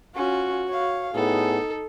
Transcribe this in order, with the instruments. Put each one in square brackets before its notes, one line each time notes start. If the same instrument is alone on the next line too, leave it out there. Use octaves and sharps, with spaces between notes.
[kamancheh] C#4 F4 [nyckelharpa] F#4
[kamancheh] C#5 F5
[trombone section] A2 B3 G#4 [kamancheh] D#4 [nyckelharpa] A4